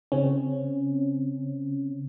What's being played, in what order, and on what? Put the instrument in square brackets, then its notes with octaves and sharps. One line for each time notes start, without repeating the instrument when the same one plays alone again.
[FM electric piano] C#3 C4 C#4